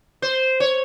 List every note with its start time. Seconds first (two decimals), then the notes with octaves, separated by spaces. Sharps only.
0.22 C5
0.60 C#5